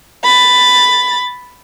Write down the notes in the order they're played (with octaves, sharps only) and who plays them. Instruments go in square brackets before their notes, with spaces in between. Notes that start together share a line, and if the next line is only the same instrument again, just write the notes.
[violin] B5 A6